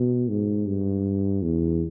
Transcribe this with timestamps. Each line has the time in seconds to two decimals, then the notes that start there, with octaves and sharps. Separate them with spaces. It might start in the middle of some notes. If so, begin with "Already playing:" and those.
Already playing: B2
0.29 G#2
0.67 G2
1.42 E2